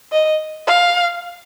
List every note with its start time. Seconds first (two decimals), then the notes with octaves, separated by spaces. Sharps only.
0.12 D#5
0.67 F5